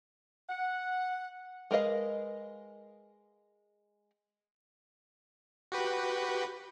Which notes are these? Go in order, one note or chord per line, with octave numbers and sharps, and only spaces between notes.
F#5
G#3 A#4 B4 D#5 F5
F#4 G4 B4